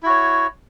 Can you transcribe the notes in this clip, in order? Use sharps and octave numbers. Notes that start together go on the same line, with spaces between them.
E4 F#4 C#5